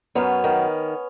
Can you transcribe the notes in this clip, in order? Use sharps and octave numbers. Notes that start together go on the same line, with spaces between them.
F#2 B3 C#4
D#3